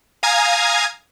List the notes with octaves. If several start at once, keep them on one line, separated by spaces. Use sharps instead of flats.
F5 G#5 A#5 D#6 G#6